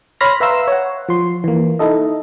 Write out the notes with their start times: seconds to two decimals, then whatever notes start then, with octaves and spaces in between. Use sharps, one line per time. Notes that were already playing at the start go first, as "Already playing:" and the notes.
0.21 C#5 B5 C6 F6 A#6
0.40 B4 E5 F5 A#5 C6 E6
0.67 C#5 F#5
1.09 F3 C6
1.44 E3 A#3
1.79 D#4 E4 A4 D#5